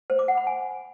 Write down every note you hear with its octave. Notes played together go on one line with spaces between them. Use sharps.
C5
D6
F#5
B5
G#5